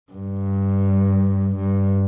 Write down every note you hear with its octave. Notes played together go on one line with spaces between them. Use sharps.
G2
G2